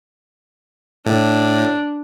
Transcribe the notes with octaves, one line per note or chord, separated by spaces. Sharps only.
A2 D4